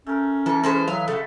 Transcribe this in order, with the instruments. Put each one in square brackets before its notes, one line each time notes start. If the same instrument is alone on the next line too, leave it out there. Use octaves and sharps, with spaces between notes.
[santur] A3 A#4 [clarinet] C#4
[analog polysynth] E3 [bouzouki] A4 [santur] A#4
[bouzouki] G#3 A4 C5 [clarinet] C#4 [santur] B4 G#5 C6
[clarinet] F#3 [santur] G#3 E5 [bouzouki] F5
[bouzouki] C#3 [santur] A3 F#4 [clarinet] A4